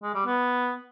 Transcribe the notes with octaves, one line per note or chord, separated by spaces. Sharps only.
G#3
G3
B3